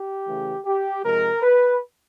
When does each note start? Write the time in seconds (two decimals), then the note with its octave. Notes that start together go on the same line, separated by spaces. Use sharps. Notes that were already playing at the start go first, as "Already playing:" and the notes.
Already playing: G4
0.27 C#3 E3 A3
0.65 G4
1.04 C3 F3 G#3 A#4
1.43 B4